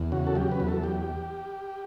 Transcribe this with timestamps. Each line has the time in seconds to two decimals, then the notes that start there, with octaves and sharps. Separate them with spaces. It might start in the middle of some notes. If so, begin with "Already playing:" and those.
Already playing: E2
0.12 C#3 F#4
0.27 A4
0.35 F#3 G4
0.52 B4
0.60 E2
0.68 A4
0.83 F#3 G4